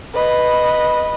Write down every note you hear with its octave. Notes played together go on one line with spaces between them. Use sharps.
B4 D#5